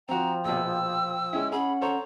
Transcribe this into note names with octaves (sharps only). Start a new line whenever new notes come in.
F3 C4 F#4 G5 A#5
A#1 B2 E6
G#3 C#4 E4
C#4 G#4 F#5 B5
A4 C5 C#5 A#5